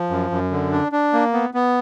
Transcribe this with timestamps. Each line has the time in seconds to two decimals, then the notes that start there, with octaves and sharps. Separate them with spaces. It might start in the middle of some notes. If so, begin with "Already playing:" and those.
Already playing: F3
0.10 F#2
0.31 F#2
0.51 D3
0.71 D4
0.92 D4
1.13 A#3
1.33 B3
1.54 B3